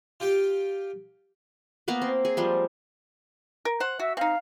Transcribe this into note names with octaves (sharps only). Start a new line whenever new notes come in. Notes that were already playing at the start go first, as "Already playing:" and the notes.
F4 G4 G5
A#3 B3 A#4 B4
C4
G#4
F3 G3 G#3
A#4
C5 F#5
F#4 E5
C4 D#4 F5